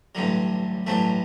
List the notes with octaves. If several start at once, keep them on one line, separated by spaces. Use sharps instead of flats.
A1 G2 D3 F#3
A1 G2 F#3 A3